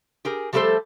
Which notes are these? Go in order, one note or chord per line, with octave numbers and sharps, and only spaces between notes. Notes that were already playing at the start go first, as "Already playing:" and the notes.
G4 G#4 A#4
F3 G3 A3 G4 A4 C5